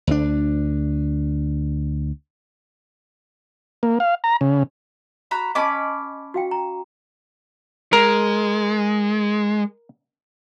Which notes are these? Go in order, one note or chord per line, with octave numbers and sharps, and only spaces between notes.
D2 D4
A#3
F5
A#5
C#3
F#4 A#5 B5
C#4 D#5 G#5 A5 B5 D6
F#4 F5 G5
A#5
G#3 A#4